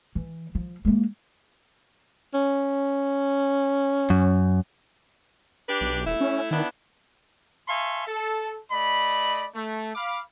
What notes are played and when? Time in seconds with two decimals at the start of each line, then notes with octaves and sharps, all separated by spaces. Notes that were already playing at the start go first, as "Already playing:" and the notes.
0.15 E3
0.55 F3
0.85 G#3 A#3
2.34 C#4
4.10 F#2
5.68 D4 G4 B4
5.81 B1
6.06 D#1 A3 E4
6.21 C#4
6.51 D#3 B3 D4 E4
7.68 E5 F5 G#5 A5 C6 C#6
8.07 A4
8.71 A3 D5 D#5 B5
9.55 A3
9.95 F5 B5 D6